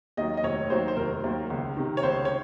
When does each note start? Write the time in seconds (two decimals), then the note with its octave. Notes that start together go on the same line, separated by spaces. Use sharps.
0.17 D#2 D#3 F#3 D#5
0.37 D#5
0.44 F1 C#5
0.70 D#2 D#3 F#3 C5
0.88 C5
0.97 F1 A#4
1.24 D#2 D#3 F#3
1.50 C#2
1.77 C3 D#3
1.97 C#5
2.03 C#2 C5
2.25 C#5